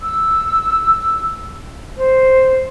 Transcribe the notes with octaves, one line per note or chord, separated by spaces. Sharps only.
E6
C5